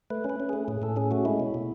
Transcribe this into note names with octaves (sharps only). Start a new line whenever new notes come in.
A3 B4
C#4
B4
C#4
A3 G#4
A2 G#4
A2 A4
C#4 G#4
A3 F#4
G#3 E4
B2
B2